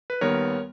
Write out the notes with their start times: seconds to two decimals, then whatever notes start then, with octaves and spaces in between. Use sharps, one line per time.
0.10 B4
0.21 D#2 D#3 G3 B3 A#4 C#5